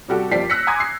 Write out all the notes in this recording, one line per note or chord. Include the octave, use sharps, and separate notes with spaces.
C3 G3 F#4 G4 A4
F#1 F3 G4 D5 B6 C7
E6 F#6 A#6 B6 C#7
G#5 A#5 C6 D6 D#6 G#6
C7